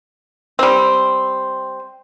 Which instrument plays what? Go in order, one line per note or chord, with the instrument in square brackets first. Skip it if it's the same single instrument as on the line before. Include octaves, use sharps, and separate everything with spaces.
[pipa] G3 C4